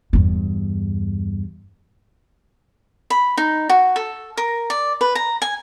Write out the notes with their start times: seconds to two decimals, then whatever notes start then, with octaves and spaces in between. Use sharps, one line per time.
0.13 E2 G2
3.10 B5
3.37 D#4
3.69 F#4
3.96 A4
4.37 A#4
4.70 D5
5.01 B4
5.15 A#5
5.42 G#5